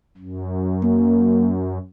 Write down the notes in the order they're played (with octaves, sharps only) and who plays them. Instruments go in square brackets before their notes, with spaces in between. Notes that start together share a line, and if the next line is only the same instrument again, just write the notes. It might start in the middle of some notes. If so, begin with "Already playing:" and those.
[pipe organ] F#2
[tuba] A#3